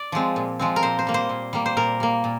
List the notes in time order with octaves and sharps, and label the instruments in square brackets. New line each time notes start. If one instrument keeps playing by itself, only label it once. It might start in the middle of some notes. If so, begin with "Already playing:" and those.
Already playing: [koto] D5
F3 G#3 C4
A#2
F3 G#3 C4
A#4
A#2 C5
C5
G3 A#3
C5
A#2
G3 A#3
C5
A#2 A#4
G3 A#3
A#2